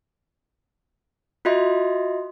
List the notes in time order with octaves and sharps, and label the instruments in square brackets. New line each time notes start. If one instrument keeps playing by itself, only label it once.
[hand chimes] F4 F#4 D#5 E5 C6